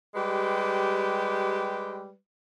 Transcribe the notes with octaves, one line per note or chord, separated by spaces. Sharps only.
G3 G#3 G4 B4